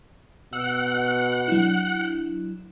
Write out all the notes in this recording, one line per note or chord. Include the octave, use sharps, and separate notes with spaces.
B2 F#5 E6 F#6
F#3 D4 E4